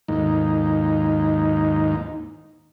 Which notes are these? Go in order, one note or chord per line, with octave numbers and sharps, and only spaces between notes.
D#2 G#2 D#4